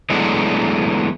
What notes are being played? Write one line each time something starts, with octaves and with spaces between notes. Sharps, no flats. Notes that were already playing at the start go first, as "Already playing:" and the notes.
E3 F#3 G#3 A3 B3 D4